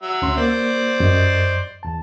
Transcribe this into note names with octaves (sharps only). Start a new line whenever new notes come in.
F#3 E5
D2 C#4 C6
A#3 C5 D5
F#2 D#5
E2 A5